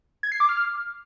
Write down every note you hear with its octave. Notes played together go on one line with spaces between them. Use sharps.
G#6
C7
D6
F6